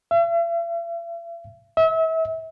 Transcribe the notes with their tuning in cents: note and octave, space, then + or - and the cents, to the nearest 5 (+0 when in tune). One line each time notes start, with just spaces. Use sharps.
E5 +45
E5 -35